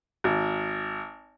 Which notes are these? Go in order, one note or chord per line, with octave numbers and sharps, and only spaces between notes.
G#1